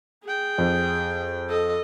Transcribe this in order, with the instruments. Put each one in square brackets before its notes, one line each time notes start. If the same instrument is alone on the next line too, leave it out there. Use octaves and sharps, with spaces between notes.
[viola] G#4 G5
[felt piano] F2
[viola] A4 D#5